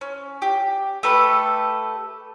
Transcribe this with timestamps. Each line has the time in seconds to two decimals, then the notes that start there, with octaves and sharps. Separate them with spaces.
0.01 C#4
0.42 G4
1.03 A3 G4 A4 B4